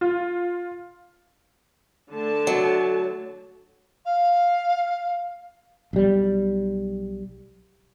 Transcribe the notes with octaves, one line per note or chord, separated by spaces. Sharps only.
F4
D3 A3 A5
F#3
F5
B1 G3